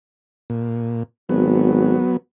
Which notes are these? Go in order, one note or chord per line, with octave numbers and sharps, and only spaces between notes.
A#2
G#1 F#3 B3